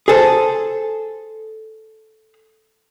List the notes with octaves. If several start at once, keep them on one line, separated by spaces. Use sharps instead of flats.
G#4 A4 C5